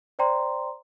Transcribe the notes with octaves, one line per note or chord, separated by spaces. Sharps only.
C5 D5 G5 A#5 C6